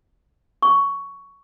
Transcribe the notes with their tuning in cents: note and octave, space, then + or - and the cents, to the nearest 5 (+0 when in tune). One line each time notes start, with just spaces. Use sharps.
C#6 +10